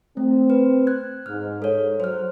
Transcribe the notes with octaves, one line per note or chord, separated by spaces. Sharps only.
A3 C4
B4
F#6 G#6
G#2 F6
G#2 A4 C#5
F#3 C5 F6